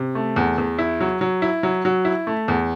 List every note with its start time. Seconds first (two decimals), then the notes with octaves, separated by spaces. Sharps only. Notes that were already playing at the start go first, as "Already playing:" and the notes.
Already playing: C3
0.15 A3
0.36 E2
0.58 E2
0.78 E4
1.01 F#3
1.21 F#3
1.42 E4
1.63 F#3
1.85 F#3
2.05 E4
2.27 A3
2.48 E2